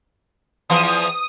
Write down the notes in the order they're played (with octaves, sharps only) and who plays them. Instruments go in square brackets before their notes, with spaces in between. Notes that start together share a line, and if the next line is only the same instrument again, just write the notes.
[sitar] E2 E3 F3 [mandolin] F5 C6 [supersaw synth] D#6